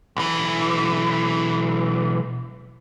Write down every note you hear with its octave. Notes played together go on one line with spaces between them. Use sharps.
B1 E3